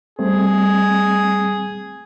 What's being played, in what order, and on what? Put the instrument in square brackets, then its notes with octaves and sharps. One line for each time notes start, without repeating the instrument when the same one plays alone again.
[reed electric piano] G3 A3 C4 [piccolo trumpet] G#4